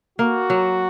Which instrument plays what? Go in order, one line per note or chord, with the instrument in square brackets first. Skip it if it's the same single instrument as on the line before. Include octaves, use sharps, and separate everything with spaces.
[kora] A#3 [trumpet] F#4
[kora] F#3